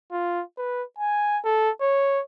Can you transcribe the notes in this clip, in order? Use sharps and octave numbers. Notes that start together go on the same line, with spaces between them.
F4
B4
G#5
A4
C#5